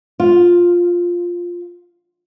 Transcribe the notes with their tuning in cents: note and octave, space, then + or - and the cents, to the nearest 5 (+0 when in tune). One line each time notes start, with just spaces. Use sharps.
F4 +5